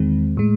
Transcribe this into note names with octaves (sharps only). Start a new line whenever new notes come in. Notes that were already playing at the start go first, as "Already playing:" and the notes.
Already playing: E2 D#3 G#3 C4
A2 G#3